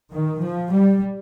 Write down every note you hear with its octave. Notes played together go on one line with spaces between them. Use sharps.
D#3
F3
G3